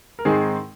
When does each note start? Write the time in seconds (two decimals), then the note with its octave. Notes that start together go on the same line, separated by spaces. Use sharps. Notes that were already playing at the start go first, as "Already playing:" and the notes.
0.19 A#4
0.25 G#2 D#3 G#3 C4 G#4